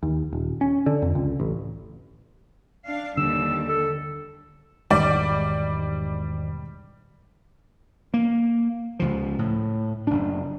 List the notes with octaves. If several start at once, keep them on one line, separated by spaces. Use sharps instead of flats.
D#2
D#1
C#4
D3
F2
C#2
A1
D4 F5
D#2 D3 G3 E6
A4
E1 G#2 D#3 G3 D5
A#3
C#2 F3
A2
F#1 D4